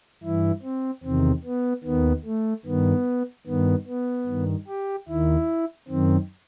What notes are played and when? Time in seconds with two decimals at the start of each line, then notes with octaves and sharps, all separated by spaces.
0.23 G2 E3 E4
0.63 C4
1.04 E2 C3 D#3 C4
1.45 B3
1.84 D#2 D#3 B3
2.25 A3
2.65 G2 D#3 B3
3.47 G2 D#3 B3
3.87 B3
4.27 G2 D#3
4.68 G4
5.08 D#2 D#3 E4
5.88 F#2 D#3 C4